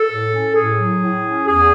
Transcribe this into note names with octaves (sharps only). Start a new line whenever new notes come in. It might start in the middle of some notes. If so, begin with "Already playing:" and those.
Already playing: A4
A2
C#4
A2 G#4
F#3
A2
C#4
E2 G#4